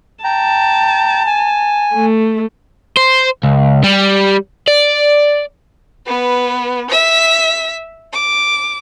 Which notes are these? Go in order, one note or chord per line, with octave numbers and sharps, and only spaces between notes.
G5 A5 A#5
G#5
A3
C5
C#2
G3
D5
B3 B4
E5 B6
D6